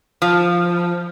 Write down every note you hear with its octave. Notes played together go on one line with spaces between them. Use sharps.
F3